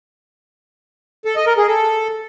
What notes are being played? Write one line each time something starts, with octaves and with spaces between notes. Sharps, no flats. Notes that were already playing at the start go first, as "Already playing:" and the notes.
A4
D#5
A#4
G#4
A4